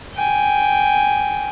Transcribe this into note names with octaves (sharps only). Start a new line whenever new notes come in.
G5 G#5